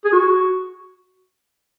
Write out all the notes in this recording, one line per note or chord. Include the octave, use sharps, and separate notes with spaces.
G#4
F#4